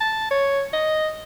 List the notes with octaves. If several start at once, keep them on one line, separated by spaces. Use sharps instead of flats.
A5
C#5
D#5